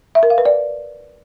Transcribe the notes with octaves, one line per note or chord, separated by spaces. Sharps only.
E5
A#4
F5
B4
D5